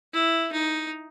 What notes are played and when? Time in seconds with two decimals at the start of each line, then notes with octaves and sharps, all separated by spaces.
0.13 E4
0.53 D#4